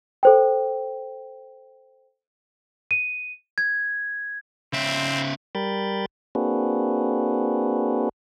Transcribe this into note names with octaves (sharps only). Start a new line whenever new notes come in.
A4 C5 G5
D#7
G#6
C#3 C4 E5
G3 A#4 G5 B5 G6 A6
A#3 C4 D4 F#4 G#4 B4